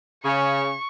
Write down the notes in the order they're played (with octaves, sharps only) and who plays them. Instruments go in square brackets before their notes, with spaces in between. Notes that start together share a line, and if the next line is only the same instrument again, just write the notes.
[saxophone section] C#3 [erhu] C#6